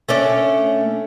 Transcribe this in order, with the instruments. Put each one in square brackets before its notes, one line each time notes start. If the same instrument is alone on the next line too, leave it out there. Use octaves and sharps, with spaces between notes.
[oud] A3 C#4 D4